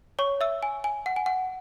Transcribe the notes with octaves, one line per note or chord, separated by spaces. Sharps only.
C#5 C#6
E5 E6
G#5
G#5
F#5
G#5
F#5